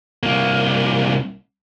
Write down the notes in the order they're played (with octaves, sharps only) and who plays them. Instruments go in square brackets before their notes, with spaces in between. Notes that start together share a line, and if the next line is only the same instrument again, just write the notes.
[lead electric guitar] C2 A#3